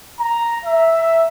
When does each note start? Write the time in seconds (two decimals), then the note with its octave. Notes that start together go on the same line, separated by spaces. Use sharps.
0.19 A#5
0.65 E5